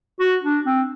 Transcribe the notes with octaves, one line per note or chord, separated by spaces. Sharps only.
F#4
D4
C4